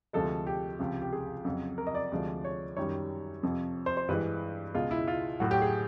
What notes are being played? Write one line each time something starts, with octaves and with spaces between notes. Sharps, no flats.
D2 C3 F3 G#3 A4
G4
C#2 C3 F3
G4
G#4
F2 C#3 F#3
A#4
D#5
D5
D2 C3 F3 G#3
C#5
F#2 D#3 G3 C#5
F2 C3 F3
C5
C5
G2 E3 G#3 B4
C#2 B2 G#3 F4
E4
F4
A2 F#3 F#4
G4
G#4